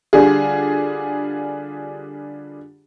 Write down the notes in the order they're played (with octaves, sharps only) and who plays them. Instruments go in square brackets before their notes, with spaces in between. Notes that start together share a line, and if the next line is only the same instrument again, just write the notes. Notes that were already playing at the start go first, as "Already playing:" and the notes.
[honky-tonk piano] D3 G3 D4 F4 G#4